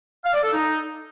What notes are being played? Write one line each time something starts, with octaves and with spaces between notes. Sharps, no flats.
F5
D5
A4
D#4